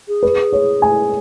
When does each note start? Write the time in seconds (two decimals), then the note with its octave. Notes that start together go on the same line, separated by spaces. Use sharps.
0.08 G#4
0.23 B4
0.53 C#5
0.82 G#5